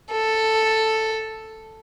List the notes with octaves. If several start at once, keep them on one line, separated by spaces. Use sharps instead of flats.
A4